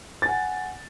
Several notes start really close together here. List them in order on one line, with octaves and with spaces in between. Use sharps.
A6 G#5 F#5